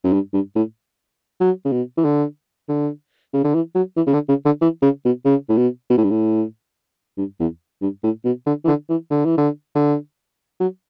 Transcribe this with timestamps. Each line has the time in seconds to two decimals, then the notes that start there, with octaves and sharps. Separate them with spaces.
0.04 F#2
0.13 G2
0.33 G2
0.56 A2
1.41 F#3
1.65 C#3
1.72 B2
1.97 E3
2.04 D3
2.69 D3
3.34 C#3
3.44 D3
3.55 E3
3.75 F#3
3.97 E3
4.07 C#3
4.14 D3
4.29 C#3
4.45 D3
4.62 E3
4.82 C#3
5.05 B2
5.25 C#3
5.49 A2
5.57 B2
5.90 B2
5.98 A2
6.04 G2
6.10 A2
7.18 G2
7.40 E2
7.82 G2
8.04 A2
8.25 B2
8.46 D3
8.65 E3
8.68 D3
8.89 E3
9.10 D3
9.25 E3
9.38 D3
9.75 D3
10.60 F#3